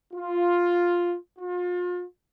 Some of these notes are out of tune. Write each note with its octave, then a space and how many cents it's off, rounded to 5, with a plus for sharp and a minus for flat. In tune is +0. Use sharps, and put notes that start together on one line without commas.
F4 +5
F4 +35